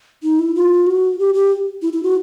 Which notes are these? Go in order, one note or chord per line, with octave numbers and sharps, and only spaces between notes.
D#4
E4
F4
F#4
G4
G4
E4
E4
F#4